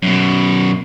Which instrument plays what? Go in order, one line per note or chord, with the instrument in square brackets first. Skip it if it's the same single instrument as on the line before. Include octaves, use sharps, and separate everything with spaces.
[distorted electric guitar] F#2 B2